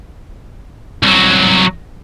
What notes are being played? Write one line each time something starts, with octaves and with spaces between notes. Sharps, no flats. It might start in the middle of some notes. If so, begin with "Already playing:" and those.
C2 F#3